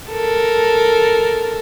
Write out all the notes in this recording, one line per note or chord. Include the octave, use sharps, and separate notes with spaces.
A4 A#4